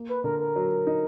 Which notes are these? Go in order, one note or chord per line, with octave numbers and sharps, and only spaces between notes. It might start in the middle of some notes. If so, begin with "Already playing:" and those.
Already playing: A#3
B4
D3 A#4
A#4
F#3
D#4